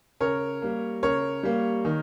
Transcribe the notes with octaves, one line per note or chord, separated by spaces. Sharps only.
C#3 A#4 C#5
G3 A#3
C#3 A#4 C#5
G3 A#3
D#3